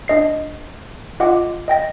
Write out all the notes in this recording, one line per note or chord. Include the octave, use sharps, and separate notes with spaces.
D4 D#5 C7
F4 D#5 F#5 D6
D#5 G5 A#6